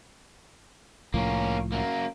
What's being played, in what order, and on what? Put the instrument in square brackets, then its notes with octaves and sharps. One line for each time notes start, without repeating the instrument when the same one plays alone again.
[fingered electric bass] C2 A2 F3 [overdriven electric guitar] A#3 C#4
[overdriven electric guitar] F#2 A#3